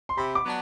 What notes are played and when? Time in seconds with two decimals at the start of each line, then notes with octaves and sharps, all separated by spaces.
0.09 C6
0.17 C3 B5
0.35 D6
0.44 F#3 B3 D4